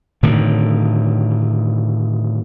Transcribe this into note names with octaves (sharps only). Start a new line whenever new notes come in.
A2 D3 D#3